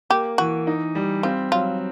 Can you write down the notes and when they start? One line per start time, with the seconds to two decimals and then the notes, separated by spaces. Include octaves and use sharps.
0.10 A#3 G4
0.38 E3 F#4
0.67 D#4
0.95 G3
1.23 C4 F4
1.52 F#3 F4